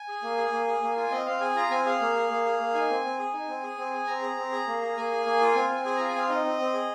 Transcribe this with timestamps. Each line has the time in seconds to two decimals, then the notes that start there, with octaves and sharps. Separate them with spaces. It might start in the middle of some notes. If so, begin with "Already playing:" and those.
Already playing: G#5
0.08 G#4
0.23 A#3
0.37 G#4
0.52 A#3
0.67 G#4
0.82 A#3
0.96 F4 G#5
1.12 C4 D#5
1.26 C4 F5
1.41 G#4 G#5
1.55 F4 A#5
1.70 C4 G#5
1.85 G#4 F5
2.01 A#3
2.15 G#4
2.29 A#3
2.45 G#4
2.59 A#3
2.74 D#4 G#5
2.90 C4
3.04 C4
3.19 G#4
3.33 D#4
3.48 C4
3.63 G#4
3.77 C4
3.93 G#4
4.07 C4 A#5
4.22 G#4
4.37 C4
4.52 G#4
4.67 A#3
4.81 G#4
4.96 A#3 G#5
5.11 G#4
5.26 A#3
5.41 F4
5.55 C4
5.70 C4
5.85 G#4 G#5
5.96 F4 A#5
6.08 G#5
6.15 C4 F5
6.29 D#4 D#5
6.45 C4
6.59 C4
6.73 G#4